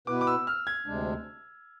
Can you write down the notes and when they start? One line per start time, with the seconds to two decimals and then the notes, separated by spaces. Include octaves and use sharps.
0.07 B2 B3 E4 B4 D6
0.21 D6
0.27 E6
0.47 F6
0.67 G#6
0.86 D2 C3 G#3 D4